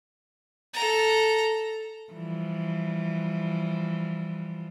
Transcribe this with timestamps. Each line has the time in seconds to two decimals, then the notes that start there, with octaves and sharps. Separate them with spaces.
0.73 A4 A#5
2.13 E3 F3 G3